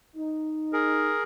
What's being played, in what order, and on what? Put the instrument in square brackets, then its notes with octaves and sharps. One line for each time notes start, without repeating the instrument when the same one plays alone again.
[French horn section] D#4
[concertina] G#4 A#4